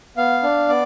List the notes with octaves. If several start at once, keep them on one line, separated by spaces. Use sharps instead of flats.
B3 F5
D4
B3 D5